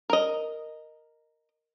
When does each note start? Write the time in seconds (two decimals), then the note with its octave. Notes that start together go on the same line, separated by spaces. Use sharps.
0.10 A#4 D#5